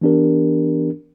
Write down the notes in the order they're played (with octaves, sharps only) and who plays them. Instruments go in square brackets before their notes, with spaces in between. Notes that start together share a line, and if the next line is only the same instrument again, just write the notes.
[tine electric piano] E3 B3 D4 G4 A#4